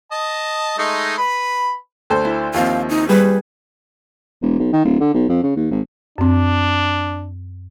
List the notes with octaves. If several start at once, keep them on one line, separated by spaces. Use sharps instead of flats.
D#5 A5
G#3 A3 D#4
B4 B5
D2 A4 C5
E4
D#2 F3 C4 F5
D#4
G3 G#4 B4
E1
B1
D#3
D1
D3
B1
F2
C#3
D#2
G#1
F#2 C4 D4